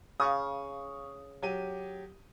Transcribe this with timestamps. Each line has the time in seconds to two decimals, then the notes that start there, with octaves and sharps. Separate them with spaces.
0.20 C#3 F5 C#6 D#6
1.42 F#3 G4 D#7